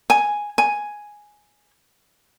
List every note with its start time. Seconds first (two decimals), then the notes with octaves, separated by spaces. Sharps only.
0.10 G#5
0.58 G#5